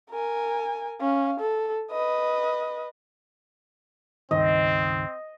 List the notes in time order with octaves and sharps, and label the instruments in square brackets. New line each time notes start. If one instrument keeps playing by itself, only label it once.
[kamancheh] A#4 G#5
C#4 F5
A4
B4 D#5
[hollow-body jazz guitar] C#2 G2 D#3 [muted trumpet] C4 [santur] D#5